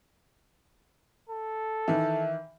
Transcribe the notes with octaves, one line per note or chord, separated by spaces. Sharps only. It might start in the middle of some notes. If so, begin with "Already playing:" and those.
A4
D#3 E3 E5